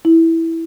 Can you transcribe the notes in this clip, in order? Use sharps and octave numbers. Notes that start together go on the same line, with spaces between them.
E4